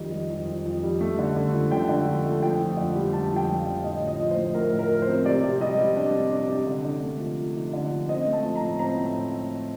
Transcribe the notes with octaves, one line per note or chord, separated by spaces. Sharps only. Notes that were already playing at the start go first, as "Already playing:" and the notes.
Already playing: F2 D#3 G3 D#5
G3
F2
F2
F2
G3
A3
D3
D3
F3
D3 G5
D3
F3
A3
F2 G5
F2
D3
G3
F2 A5
F2
G5
G3
F5
D3
A2 D#5
F3
D#5
F3
C5
A2
A2 A#4
A2
A#4
F3
C5
C4
C3 D5
C3
G3 D#5
G3
D4
C3
D4
C3
D3
D3
A3
F3
F3
D#4
D3
F3
C4 D#5
A3
A5
F3
A#5
A2
C4 A#5
A2